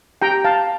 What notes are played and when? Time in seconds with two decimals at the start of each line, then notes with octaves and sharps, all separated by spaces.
0.22 G4 G5 A#5
0.45 F5 A5